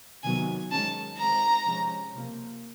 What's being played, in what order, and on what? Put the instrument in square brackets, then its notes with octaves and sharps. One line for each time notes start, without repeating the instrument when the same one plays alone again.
[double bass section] C3 D#3 F#3 B3 [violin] G#5
[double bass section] D#3 G#3 C#4 [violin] A5
[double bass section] D#3 G#3 C4 [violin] A#5
[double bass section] C3 F3 G#3 C#4
C3 F3 A#3